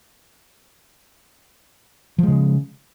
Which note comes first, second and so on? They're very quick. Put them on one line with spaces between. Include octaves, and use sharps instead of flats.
F3 G#3 C#3